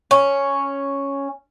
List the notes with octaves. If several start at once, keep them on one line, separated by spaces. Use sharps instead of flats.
C#4